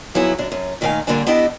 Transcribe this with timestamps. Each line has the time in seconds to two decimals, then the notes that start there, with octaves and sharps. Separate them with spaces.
0.15 F3 F#3 B3 E4 G#4
0.38 F#2 D4
0.52 F#2
0.81 A#2 D#3 A3 G#4 F5 G#5
1.07 A#2 D3 G3 A#3 D4 G#5
1.27 B3 D4 E4 G4 D#5